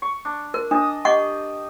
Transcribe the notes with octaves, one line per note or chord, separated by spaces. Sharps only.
C#6
D4
A#4
D4 D#5 A5 D#6
G4 D#5 F#5 C#6